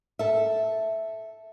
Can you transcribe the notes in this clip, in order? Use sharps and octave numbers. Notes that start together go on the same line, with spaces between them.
A4 E5